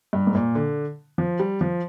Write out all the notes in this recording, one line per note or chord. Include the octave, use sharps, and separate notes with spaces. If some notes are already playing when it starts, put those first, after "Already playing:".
G2
G#2
A#2
D3
F3
G3
F3